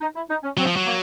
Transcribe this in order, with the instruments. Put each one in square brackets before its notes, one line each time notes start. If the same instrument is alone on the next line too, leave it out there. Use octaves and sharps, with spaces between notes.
[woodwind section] D#4
E4
D#4
C#4
[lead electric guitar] F#3 [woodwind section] C4
[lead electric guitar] F3
F#3
[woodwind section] A#3